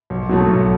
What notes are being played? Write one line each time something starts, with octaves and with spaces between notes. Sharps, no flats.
B1
B2 F#3 A3
B1